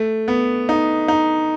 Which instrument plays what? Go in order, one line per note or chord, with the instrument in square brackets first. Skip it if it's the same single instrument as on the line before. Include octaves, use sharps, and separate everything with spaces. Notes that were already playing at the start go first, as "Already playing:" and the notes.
Already playing: [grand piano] A3
B3
D#4
D#4